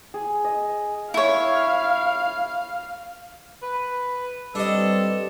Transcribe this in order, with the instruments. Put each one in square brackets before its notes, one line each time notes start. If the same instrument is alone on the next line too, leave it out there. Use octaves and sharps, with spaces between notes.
[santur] G#4
D#5
[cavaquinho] E4 C#5 [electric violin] F5
[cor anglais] B4
[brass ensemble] G3 C4 B4 [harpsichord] D4 D#5 [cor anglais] A4